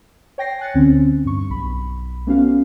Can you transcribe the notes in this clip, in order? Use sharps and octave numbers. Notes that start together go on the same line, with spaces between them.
C#5 G5 A#6 C7
G#5 F#6 A6 C#7
D2 D3 C4 C#4
G2 C#6
B1 B5
A3 B3 C#4 F#4 F5